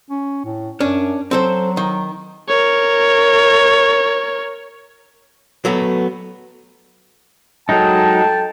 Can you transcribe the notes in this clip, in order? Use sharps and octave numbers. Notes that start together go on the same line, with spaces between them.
C#4
A2
F#2 C#4 D4
F#3 C4 A4 C5
D#3
A#4 C#5
F#3 A3 B3
F#3 G#3 D#4 A4 G5 A5